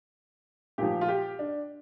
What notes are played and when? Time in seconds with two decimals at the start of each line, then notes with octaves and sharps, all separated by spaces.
0.78 A#2 F3 G4
1.01 F4
1.08 G4
1.39 D4